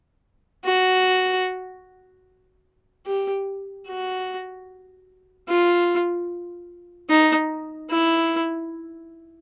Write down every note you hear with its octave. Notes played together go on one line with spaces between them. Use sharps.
F#4
G4
F#4
F4
D#4
E4